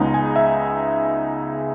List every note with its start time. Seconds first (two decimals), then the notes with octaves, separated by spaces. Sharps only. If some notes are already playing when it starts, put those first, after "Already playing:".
Already playing: C#2 C#3 G#3 B3 D#4
0.14 G#5
0.36 E5